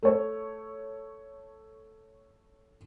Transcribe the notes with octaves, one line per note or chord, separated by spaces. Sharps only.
A3 C#5